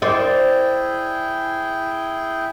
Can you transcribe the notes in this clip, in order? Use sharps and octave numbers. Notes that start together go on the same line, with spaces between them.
E4 G#4 C5 D5 G5